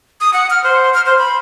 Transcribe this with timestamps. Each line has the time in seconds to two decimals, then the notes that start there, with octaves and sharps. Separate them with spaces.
0.21 D#6
0.33 F#5
0.50 F6
0.64 C5
0.94 F6
1.06 C5
1.18 B5